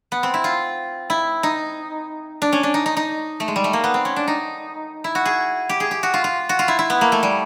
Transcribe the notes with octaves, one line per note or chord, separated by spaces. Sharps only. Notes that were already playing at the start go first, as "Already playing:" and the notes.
B3
C4
E4
F4
E4
D#4
D4
C#4
D4
D#4
D#4
D#4
A3
G#3
G3
A3
A#3
B3
C4
C#4
D4
D#4
E4
F#4
G#4
G4
G#4
G4
F#4
F4
F4
F#4
F4
E4
E4
B3
A#3
A3
G3